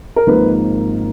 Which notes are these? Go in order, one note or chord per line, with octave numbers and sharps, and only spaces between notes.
A#4
G#1 G#2 F3 A#3 B4